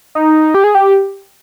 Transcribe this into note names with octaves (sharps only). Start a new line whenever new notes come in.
D#4
G4
G#4
G4